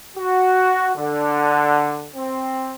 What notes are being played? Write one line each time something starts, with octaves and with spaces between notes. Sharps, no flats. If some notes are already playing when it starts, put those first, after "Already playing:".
F#4
D3
C4